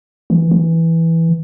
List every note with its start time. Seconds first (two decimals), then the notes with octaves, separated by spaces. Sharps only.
0.30 E3
0.51 E3